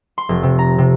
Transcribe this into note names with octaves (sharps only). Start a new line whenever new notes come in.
C6
F1
C3
A#5
C3